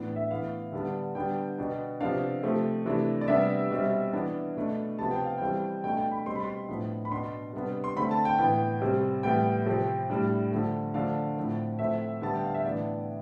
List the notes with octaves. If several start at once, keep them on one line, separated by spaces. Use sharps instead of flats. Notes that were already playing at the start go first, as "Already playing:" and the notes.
Already playing: A2 E3 B3 D4
E5
A2 E3 B3 F5
D3 G3 B3 D4
D3 G3 B3 D4 G5
B2 B3 D4
C3 F3 B3 D4 F5
C3 F3 A3 C4
C3 E3 A3 D4
D5
C3 G3 B3 D4 E5
B2 G3 C4
E3 B3 D4
B2 A3 D4
C3 F3 B3 A5
G5
F5
E3 G3 C4 G5
B2 A3 D4 G5
G5
B5
B2 G3 C4 C6
B5
C6
A2 F3 B3 D4
B5
B2 B3 D4 C6
C3 G3 B3 D4
C6
D3 A3 C4 B5
A5
G5
A2 E3 B3 G5
C3 G3 C4
A2 E3 G3 B3 G5
C3 F3 C4
A2 G3 D4
D3 F3 A3
D3 F3 A3 D4 F5
A2 F3 C4
A2 F3 A3 C4 E5
D3 G3 B3 A5
G5
F5
E5
A2 E3 B3 D4 D5